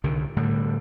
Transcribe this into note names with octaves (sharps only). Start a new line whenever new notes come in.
C2 D3 D#3
A2 D3 G3